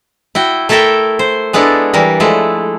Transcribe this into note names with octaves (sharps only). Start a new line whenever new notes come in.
E4 F#4 G5
A3 E4 A4 A#4 E5 G5
C5
G#3 B3 D4 E4 A4 A#4
E3 G3 A#4
F3 G#3 A3 E4